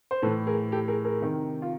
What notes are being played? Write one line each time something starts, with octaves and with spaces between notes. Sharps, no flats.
C5
A2 E3 A4 B4
G#4 A#4
G4 A4
G#4 A#4
G#4 A#4
C3 D#3
F4